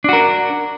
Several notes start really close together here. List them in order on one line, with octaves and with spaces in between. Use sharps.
D4 F#4 A#4